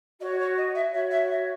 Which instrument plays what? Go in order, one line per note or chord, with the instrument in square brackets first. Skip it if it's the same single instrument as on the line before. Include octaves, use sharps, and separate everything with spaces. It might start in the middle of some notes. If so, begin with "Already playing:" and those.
[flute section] F#4 D#5
C#5
C#5
D#5
E5
F#4 C#5 E5
E5
E5